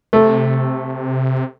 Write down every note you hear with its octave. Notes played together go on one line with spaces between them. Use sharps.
C3 A3